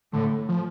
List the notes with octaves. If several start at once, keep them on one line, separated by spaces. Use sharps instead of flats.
A2 D3
F3